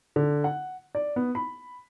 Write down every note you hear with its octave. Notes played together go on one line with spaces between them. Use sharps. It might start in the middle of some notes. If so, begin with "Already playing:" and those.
D3
F#5
D5
B3
B5